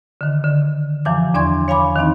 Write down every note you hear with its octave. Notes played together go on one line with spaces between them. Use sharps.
D3 D#3
D3
F#2 E3 F3 G#5 D6
E2 D4 D5 C6 C#6 G#6
C#5 F5 G#5 B5 D6
D#3 E3 C4 D#4